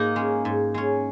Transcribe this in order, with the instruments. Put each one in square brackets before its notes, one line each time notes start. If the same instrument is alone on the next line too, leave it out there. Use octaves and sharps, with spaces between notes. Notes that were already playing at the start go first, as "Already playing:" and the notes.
Already playing: [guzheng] G#2 F#4 [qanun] A#3 D#4
[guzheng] G#3 C#4
G#2
G#3 C#4